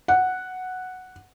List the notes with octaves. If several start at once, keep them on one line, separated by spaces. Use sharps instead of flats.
F#5